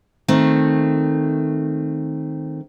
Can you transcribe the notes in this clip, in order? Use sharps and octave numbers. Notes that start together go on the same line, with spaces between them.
D#3 A3 C4